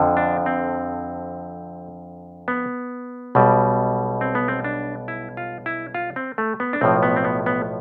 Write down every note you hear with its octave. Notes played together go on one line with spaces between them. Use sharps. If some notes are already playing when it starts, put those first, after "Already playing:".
Already playing: F2 D3 F3
D4
C4
B3
B1 B2 G3
C4
B3
C4
D4
E4
F4
E4
F4
C4
A3
B3
D4
B1 A2 F3 C4
B3
C4
B3
B3